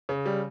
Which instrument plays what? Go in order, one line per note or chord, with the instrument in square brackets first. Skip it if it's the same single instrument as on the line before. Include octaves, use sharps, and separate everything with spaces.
[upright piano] C#3
G3